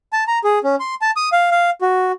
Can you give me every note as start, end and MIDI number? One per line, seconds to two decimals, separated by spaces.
0.13 0.24 81
0.27 0.39 82
0.44 0.59 68
0.64 0.75 61
0.80 0.95 84
1.02 1.11 81
1.16 1.29 87
1.32 1.50 77
1.51 1.70 77
1.81 2.12 66